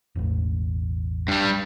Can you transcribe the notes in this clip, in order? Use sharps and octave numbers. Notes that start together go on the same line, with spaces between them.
E1 A1
G2 G3 D4